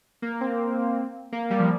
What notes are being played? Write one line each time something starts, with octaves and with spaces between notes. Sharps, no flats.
A#3
C4
A#3
G3
F3